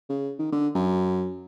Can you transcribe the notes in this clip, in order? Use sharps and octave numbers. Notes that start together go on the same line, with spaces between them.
C#3
D#3
D3
F#2